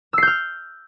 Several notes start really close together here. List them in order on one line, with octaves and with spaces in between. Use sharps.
E6 C7 G6 F6